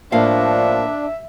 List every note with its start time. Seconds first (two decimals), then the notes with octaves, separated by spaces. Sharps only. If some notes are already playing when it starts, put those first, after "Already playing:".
0.12 A2 F3 A#3 D4 E5 F5